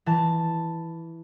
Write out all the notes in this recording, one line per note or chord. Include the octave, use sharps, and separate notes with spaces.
E3 A5